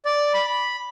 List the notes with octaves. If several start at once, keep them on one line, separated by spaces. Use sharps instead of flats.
D5
B5
B5